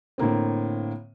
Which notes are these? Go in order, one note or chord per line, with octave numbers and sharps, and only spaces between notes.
A2 D3 A#3 C4